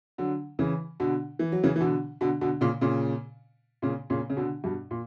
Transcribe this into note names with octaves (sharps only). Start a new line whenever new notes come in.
D3 F#3
C#3 E3
B2 D3
E3
F#3
C#3 E3
E3
B2 D3
B2 D3
B2 D3
A#2 C#3
A#2 C#3
A#2 C#3
A#2 C#3
C#3
B2 D3
G2 B2
A#2